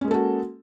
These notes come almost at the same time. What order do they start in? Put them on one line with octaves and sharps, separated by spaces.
C#4 G#3 A#3 A4 F#4